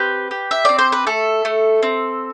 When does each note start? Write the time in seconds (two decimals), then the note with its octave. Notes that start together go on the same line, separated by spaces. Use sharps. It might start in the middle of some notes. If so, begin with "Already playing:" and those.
Already playing: C4 G4 B4
0.31 G4
0.51 E5
0.65 C4 D5
0.78 C5
0.92 B4
1.07 A3 A4
1.45 A3
1.83 C4